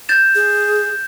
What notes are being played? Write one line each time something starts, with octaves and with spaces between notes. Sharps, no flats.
G6 A6 E7
G#4